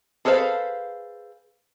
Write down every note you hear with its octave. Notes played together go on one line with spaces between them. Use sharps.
G#4 A4 B4 C5 F5